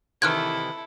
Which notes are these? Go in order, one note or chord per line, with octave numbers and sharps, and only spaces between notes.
C3 D#3 E3 E4 A4 F6 F#6 G#6